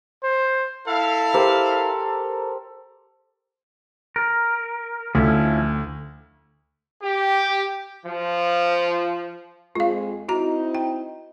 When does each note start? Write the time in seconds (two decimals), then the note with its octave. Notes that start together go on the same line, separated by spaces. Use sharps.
0.23 C5
0.88 E4 A4 F5
1.34 G4 A#4 C5
4.16 A#4
5.15 D2 F3 C#4 E4
7.03 G4
8.05 F3
9.75 F2 G#3 F4 F5
10.29 C4 D#4 E4 F#4 A#5
10.75 G5